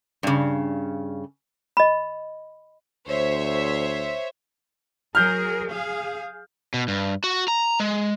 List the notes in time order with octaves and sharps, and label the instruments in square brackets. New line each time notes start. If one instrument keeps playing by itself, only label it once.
[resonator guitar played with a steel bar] G2 C#3
[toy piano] D#5 B5
[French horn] D2 [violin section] C5 C#5 E5
[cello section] F#3 G#4 A#4 [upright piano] F6 G6
[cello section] G#4 F5
[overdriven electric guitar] B2
G2
F#4
A#5
G#3